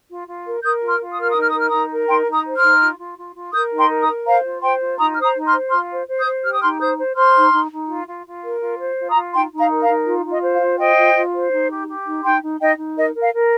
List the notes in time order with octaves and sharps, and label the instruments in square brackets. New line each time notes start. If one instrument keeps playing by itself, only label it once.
[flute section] F4
F4
A#4
A#4 D#6 G6
F4
C6 F6
F4
D#6
A#4 F6
D#6
D#4 F6
A#4 D#6
F6
D#4 A#5 D#6
A#4
D#4 G5 C6
D#4
A#5 D#6
C5
C6 F6
D#4
F4
F4
F4
F4
A#4 D#6 G6
D#4
G5 C6
A#4
A#5 D#6
A#4
C5 F5 A#5
F4
C5 G5 C6
F4
D#4 A#5 D#6
C5 F6
A#5 D#6
D#4
C6 F6
C5
F4 C6 F6
C5
C5
D#6 G6
C5
G4 F6
D#6
D#4 C6 F6
C5 D#6 G6
C5
C5 C6 F6
D#4
D#4
D#4
F4
F4
F4
A#4
F4
C5
F4
A#5 D#6
F4
D#4 G5 C6
D#4
F5 A#5
A#4
F5 A#5
D#4
F4
F4
D#5
C5
F5
F4
C5 D#5 G5
F4
F4
C5
D#4
G4
G4
D#4
D#4 G5 C6
D#4
D#4 D#5 G5
D#4
A#4 D#5
A#4
F5
A#4